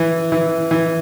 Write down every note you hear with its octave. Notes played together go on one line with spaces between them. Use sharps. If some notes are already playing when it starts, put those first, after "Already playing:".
Already playing: E3
E3
E3